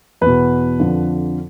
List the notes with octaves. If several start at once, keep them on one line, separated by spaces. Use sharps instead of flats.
E2 B2 B4
F2 D3 F3